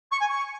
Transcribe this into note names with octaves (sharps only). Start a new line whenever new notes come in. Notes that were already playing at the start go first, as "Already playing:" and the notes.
C#6
G#5
C#6